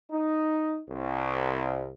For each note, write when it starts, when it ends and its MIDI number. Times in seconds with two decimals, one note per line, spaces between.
0.12 0.80 63
0.90 1.89 36